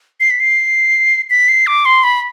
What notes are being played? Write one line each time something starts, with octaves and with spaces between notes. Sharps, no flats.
C7
B6
C7
B6
C7
D6
C6
B5